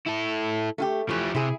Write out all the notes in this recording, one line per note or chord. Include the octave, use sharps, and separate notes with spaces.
E4 A4
A3 F4 G4
E3 F3 A3 G4
C3 E4 G#4